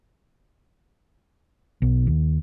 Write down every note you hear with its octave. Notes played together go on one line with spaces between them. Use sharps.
B1
D#2